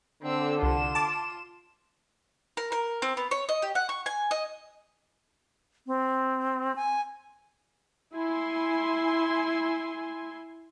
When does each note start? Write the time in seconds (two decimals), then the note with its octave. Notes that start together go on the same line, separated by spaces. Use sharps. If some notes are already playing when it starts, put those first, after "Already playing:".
0.23 D3 C4 E6
0.62 C2 F4 E7
0.95 A5 D6
2.57 A#4
2.72 A#4
3.02 C4
3.17 B3
3.31 C#5
3.49 D#5
3.62 G4
3.75 F#5
3.89 C#6
4.06 G#5
4.31 D#5
5.87 C4
6.76 G#5
8.14 E4 G#5 C6